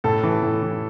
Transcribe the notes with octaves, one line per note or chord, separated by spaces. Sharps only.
A2 A4
E3
A2
E3